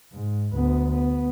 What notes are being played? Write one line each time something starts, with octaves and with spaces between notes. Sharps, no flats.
G#2
D2 B3
B3